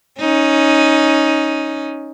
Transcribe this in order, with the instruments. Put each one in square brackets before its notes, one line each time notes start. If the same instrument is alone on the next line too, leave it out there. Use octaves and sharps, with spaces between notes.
[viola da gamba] C#4 D#4